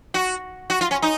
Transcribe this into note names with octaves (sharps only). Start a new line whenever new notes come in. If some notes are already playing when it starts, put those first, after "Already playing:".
F#4
F#4
F4
C#4
D#4